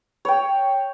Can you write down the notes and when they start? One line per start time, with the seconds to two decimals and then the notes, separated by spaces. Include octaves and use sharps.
0.25 C#5 G5